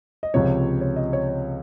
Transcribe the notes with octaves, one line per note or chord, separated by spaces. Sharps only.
D#5
C#2 C3 F3 C#5
C#5
D#5
C#5
C#5